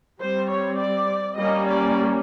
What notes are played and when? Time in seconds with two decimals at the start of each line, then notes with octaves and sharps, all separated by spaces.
0.21 G3 C4 C5
0.49 C#5
0.79 D5
1.37 G3 A#3 C#4 D#5
1.67 D5